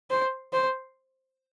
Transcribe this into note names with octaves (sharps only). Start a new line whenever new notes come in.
C5
C5